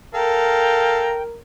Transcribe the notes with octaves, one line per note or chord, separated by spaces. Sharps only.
A4 A#4 F5 G5 A#5